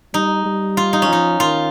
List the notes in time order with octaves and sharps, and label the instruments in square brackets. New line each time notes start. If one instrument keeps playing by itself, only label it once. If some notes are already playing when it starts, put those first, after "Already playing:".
[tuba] G3 [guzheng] D#4
[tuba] G3
[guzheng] F4
D#4
C#4
[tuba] F3 [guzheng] D#4
[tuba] D#3 [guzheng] F4